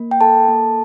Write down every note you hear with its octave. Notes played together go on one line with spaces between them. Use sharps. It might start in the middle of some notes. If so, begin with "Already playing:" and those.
Already playing: A#3
G5
A4 A5
A#3